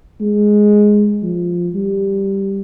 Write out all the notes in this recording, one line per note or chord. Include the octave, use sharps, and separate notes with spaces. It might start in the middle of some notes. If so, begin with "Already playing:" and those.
G#3
F3
G3